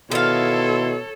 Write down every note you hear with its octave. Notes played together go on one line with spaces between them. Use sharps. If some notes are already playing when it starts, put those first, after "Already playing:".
B2 D#3 E4 A4 C#5 F5 C6